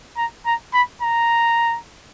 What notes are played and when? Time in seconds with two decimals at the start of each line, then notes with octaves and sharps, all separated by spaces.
0.17 A#5
0.46 A#5
0.74 B5
1.02 A#5